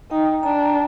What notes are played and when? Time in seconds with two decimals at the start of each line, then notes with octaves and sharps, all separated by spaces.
0.11 D#4 G5
0.43 D4 A#5